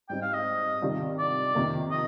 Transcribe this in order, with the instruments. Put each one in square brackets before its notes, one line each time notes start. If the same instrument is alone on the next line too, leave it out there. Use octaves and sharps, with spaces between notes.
[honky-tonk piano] G#2 G3 C4 D#4 [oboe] G5
[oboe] F5
D#5
[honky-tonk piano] C3 D#3 G3 D4 F4
[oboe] D5
[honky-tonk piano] F2 C3 D#3 A#3
[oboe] D#5